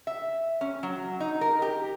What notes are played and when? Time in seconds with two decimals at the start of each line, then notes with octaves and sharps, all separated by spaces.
0.07 E5
0.61 C#4
0.83 F#3
1.20 D#4
1.41 A#4
1.62 G4